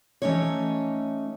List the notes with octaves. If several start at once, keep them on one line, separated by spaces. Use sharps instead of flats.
E3 A3 A#3 C#4 D#4 C#5